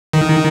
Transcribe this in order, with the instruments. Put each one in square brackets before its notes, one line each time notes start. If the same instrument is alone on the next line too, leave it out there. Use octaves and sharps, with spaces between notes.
[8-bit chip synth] D#3